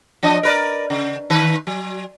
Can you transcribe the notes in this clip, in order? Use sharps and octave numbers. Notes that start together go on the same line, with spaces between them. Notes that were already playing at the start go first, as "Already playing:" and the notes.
F3 D4 D#5
A#4 B4 D5
C#3
D#3 B4
F#3